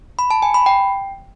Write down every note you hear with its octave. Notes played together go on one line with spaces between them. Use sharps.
B5
A5
G#5
B5
G5